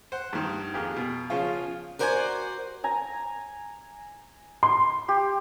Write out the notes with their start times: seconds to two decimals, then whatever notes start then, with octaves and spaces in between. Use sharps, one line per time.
0.12 C5 F#5
0.33 G2 D#3
0.74 F2 A#3 G4 G#4 A#4
0.96 B2
1.30 C#3 F3 C#4 F4 G#4
1.99 F#4 A#4 C5 D5 F5 G#5
2.84 G#5 A#5
4.63 C6
5.09 G4